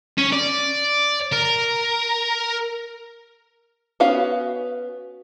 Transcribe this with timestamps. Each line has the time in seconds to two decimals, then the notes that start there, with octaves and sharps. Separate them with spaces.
0.18 C#4
0.32 D5
1.33 A#4
4.00 B3 C#4 F#4 F5